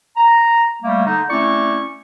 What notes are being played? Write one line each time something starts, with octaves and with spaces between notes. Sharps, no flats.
A#5
G3 A3 A#3
D3 D#4
A3 C4 C#4 E4 D5 C#6